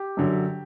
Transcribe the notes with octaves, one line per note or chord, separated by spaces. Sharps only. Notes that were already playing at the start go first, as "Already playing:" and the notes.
Already playing: G4
F#2 D3 F#3